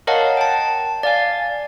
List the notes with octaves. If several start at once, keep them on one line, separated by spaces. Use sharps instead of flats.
A#4 C#5 D#5 F5 F#5 A5
G5 A5
D5 F5 G#5